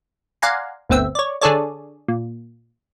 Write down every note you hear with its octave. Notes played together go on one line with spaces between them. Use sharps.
D5 F5 F#5 G#5 A#5 C6
G1 D2 B3 C4 E5
C#5 D5
D3 D4 G#4 A4 C#5 D5
A#2